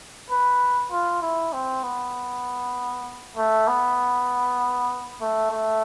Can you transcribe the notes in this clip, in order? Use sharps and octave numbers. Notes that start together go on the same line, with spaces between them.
B4
F4
E4
C4
B3
A3
B3
A3
A3